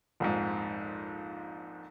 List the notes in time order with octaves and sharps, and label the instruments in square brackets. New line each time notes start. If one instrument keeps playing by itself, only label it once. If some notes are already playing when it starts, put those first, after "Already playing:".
[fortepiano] A#1 F2 G#2